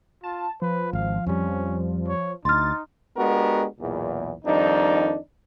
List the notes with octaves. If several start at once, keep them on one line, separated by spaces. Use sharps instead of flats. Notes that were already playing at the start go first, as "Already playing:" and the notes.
F4 A5
F3 B4
G#1 F5
F2 G3 C#4
C#5
D2 D#4 C6 F6 A6
G#3 B3 D4 F#4 G4 A#4
B1 E2 A#2
F2 D#3 G3 D4 D#4